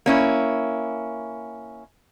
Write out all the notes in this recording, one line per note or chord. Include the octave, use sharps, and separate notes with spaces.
A#3 C#4 E4